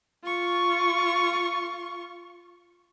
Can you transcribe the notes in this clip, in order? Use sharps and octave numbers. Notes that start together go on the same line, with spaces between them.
F4 C#6